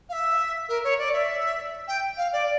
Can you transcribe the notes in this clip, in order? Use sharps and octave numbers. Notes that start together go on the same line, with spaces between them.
F5
E5
A#4
C#5
D5
E5
G5
F5
D5